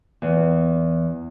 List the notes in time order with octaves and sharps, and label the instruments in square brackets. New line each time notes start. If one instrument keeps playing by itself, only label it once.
[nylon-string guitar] E2